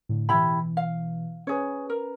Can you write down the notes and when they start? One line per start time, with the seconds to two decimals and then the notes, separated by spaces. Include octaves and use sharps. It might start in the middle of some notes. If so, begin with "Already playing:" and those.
0.09 A2 D3
0.29 B2 E3 E4 G4 B5
0.77 F5
1.47 C#4 G#4 B4 C#5
1.90 A#4